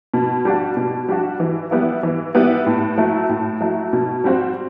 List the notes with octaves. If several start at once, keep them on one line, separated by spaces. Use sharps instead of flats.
B2
G3 D4 F#4
B2
G3 D4 F#4
E3
G3 B3 E4
E3
G3 B3 E4
A2
F#3 A3 E4
A2
F#3 A3 E4
B2
G3 C4 F#4